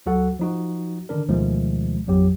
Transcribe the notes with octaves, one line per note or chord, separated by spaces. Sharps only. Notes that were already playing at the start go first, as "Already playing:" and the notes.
D2 F#3 F#4 A4 F#5
F3 D#4 F#4
D3 D#3 D4 A#4
D2 B2 D#3 F3 G#3 A3
A1 F2 F#3 G4